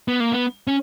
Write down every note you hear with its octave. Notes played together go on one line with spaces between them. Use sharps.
B3
A#3
B3
C#4